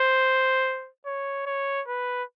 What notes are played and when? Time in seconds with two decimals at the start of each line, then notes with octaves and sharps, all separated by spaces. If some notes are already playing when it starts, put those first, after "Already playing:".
Already playing: C5
1.06 C#5
1.46 C#5
1.87 B4